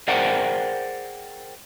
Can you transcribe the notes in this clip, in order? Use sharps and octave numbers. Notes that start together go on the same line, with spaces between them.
G#4 A#4 C5 D5 F#5 G5